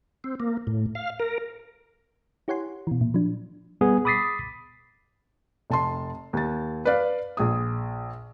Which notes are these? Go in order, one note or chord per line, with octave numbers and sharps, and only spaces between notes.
C4
A#3
A2
F5
A#4
E4 G4 C#5 F#5 G#5 C6
B2 E3
A#2
F3 F#3 D4
G3 B3 G#4
B5 D6 D#6 A6 B6 C7
F1 A5 C6
D#2 A6
B4 D5 F5
A#1 G#4 D#6